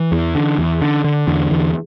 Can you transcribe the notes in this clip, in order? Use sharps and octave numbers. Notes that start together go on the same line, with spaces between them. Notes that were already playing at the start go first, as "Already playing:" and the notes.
Already playing: E3
E2
D3
E2
D3
D3
E2 D3
E2